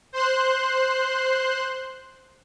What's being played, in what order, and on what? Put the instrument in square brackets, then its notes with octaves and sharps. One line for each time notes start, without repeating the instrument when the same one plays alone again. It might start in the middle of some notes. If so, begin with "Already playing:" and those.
[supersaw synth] C5 C6 F#6